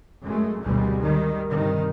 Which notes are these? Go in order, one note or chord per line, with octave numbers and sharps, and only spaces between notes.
F#2 G#3 A3
G#1 D2 B2 G3 G#3
D#3 G3
G2 C3 D#3